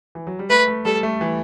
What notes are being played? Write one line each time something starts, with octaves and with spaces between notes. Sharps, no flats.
E3
F#3
G3
A3 B4
A3
G3 A4
A3
E3